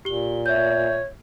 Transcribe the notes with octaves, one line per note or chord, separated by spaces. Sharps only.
A#2 G4 G7
C#5 E5 G6